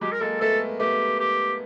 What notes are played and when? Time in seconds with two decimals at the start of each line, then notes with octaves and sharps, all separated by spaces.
0.01 F#3 G#3 G4
0.12 A#4
0.21 G#3 A#3 A4
0.41 A3 B3 A4
0.80 A3 B3 G4
1.19 G4